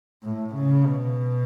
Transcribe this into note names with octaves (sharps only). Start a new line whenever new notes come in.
A2
C#3
B2